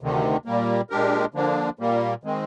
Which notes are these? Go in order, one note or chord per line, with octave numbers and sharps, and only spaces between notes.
D2 C3 D#3
A#2 G3 A#3
A#2 G#3 D4 G4 A#4
D3 F3 A#3 D4
A#2 G3 A#3
D#3 G#3 C4